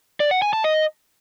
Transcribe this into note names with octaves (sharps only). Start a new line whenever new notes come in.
D5
F#5
G#5
A5
D#5